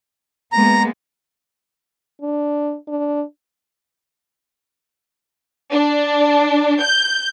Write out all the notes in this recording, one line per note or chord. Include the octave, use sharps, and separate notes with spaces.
G#3 A#3 B3 A#5
D4
D4
D4
G6